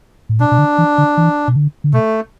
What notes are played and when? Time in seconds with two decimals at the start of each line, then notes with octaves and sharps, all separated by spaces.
0.29 A2
0.40 B2 D4
0.52 B2
0.59 D3
0.78 E3
0.98 D3
1.17 E3
1.48 B2
1.56 D3
1.84 D3
1.93 B2 A3